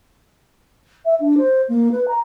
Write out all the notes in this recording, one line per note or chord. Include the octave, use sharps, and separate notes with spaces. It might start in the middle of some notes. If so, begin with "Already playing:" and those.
E5
D4
C5
A#3
B4
A#5